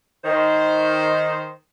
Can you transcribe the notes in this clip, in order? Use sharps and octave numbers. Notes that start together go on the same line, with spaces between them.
D#3 C5